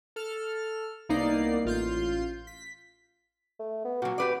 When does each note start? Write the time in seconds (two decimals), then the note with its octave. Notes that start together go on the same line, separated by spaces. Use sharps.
0.16 A4 F6
1.09 C2 A#3 B3 D#4 D5 C7
1.65 A1 F4 C6 G6
2.47 B6
3.59 A3
3.84 B3
4.02 A#2 F#3 F#4
4.18 G4 B4 D5